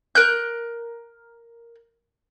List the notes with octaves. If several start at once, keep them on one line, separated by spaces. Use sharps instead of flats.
A#4 F#6 G6